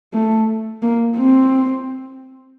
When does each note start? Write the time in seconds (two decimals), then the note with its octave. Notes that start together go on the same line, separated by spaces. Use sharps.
0.14 A3
0.82 A#3
1.17 C4